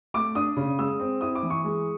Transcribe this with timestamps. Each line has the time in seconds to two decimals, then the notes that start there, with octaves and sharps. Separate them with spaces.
0.14 A3 D6
0.35 D4 D#6
0.57 C#3
0.79 G#3 E6
1.00 C4
1.21 E4 D#6
1.35 D6
1.43 E3
1.50 C#6
1.64 G#3